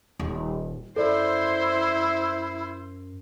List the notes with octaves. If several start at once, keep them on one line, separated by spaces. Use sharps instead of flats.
D#1
F#2 E4 A4 C5 D5